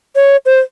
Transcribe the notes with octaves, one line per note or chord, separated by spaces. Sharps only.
C#5
C5